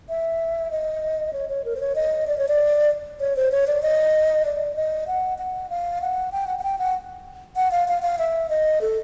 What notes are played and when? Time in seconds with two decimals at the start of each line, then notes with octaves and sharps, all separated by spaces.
0.09 E5
0.71 D#5
1.33 C#5
1.49 C#5
1.65 A#4
1.76 C5
1.80 C#5
1.95 D#5
2.27 D5
2.38 C#5
2.48 D5
3.20 C#5
3.36 C5
3.52 C#5
3.67 D5
3.82 D#5
4.45 D5
4.76 D#5
5.07 F#5
5.38 F#5
5.70 F5
6.01 F#5
6.32 G5
6.47 F#5
6.59 F#5
6.63 G5
6.78 F#5
7.56 F#5
7.71 F5
7.88 F5
8.02 F5
8.19 E5
8.50 D#5
8.81 A4